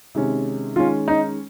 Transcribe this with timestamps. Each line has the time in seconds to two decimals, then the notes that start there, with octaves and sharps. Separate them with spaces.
0.15 C3 D#3 G#3 C#4
0.76 D#3 G#3 C#4 F4
1.08 D#4